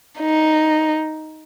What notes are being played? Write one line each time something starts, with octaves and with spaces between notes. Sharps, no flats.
D#4